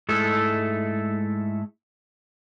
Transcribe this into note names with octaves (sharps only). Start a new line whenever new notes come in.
G#2 G#3 A3 E4 A4